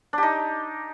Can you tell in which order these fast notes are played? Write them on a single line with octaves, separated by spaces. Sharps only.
D4 G4 D#4